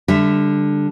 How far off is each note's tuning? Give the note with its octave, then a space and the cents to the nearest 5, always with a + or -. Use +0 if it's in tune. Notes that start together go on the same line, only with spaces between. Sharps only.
D3 +0 G3 +20 E5 +0